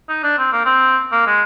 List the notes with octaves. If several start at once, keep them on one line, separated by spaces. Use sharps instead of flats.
D#4
D4
C4
A#3
C4
A#3
G#3